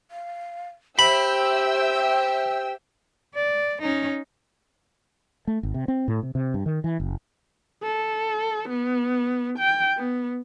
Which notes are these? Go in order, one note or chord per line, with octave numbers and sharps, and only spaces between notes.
F5
G4 C5 E5 G5 B5 E6
D5
C#4 D#4
A3
G#1
C3
C4
A2
C3
C3
G2
D#3
E3
F#1
A4
B3
G5
B3